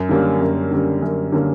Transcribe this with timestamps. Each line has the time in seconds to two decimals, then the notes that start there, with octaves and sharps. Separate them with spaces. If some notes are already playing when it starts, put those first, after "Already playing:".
Already playing: F#2
0.09 D3 G3 A#3 C#4
0.41 F#2
0.71 D3 G3 A#3 C#4
1.02 F#2
1.32 D3 G3 A#3 C#4